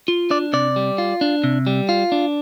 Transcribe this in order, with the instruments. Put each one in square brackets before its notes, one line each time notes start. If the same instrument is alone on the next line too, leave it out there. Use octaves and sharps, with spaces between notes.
[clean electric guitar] F4
D4 D5
C3 D5
G3
F4
D4
C3
G3
F4
D4